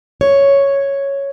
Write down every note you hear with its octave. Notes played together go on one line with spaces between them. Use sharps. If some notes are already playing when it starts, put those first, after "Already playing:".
C#5